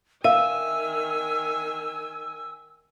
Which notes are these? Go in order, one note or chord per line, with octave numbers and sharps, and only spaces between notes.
D#3 E5 F5 G#5 E6